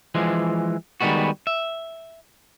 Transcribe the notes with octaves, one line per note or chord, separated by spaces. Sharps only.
E3 F3 G#3
D#3 G3 G#3 B3 F#4
E5